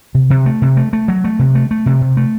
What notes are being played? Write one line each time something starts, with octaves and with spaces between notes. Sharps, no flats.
C3
C3
A3
C3
A3
A3
F#3
A3
C3
A3
A3
C3
C3
A3